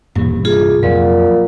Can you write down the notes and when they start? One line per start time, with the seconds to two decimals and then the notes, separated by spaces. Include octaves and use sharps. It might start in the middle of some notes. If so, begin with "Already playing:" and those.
0.15 D#1 G2 A#2 E3
0.45 C2 F4 G#4
0.83 F2 A#2 F#3